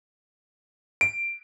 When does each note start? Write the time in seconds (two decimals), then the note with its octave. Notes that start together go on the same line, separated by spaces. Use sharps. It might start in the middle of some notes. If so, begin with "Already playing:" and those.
1.01 D7